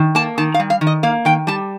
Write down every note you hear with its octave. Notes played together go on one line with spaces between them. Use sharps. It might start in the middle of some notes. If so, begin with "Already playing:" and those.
Already playing: D#3
A#3 A5
D#3 A5
F5
G3
F5
D#3
D#5
A#3 F5
D#3 G5
G3 A5